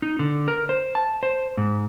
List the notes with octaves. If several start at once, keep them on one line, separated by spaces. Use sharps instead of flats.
D#4
D3
A#4
C5
A5
C5
G#2